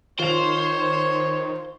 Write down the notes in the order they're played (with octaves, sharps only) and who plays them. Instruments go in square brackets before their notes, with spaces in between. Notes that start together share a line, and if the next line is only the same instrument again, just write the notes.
[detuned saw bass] D#3 [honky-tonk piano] F4 F7 [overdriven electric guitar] C5 [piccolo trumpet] C#5